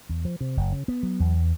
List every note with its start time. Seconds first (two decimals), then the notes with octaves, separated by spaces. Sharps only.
0.09 E2
0.25 F3
0.41 C3
0.57 F#1
0.72 C#3
0.88 B3
1.03 F#3
1.20 E2